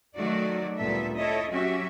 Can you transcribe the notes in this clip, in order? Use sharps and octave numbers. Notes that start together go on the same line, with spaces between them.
D#3 F#3 A3 F#4 D5
D2 A#2 G3 B3 A4 E5
E4 A4 C#5 D#5 E5
F#3 C#4 F#4 G4 E5